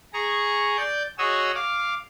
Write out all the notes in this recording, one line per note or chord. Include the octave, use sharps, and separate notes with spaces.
G#4 A#5 C#6
D5 G6
F#4 G#4 C#5 D#5 E6
F5 D6